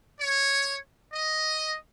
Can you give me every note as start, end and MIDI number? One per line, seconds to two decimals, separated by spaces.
0.20 0.78 73
1.13 1.76 75